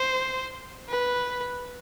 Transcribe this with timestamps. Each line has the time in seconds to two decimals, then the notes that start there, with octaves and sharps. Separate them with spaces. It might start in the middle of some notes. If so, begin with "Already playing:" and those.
Already playing: C5
0.89 B4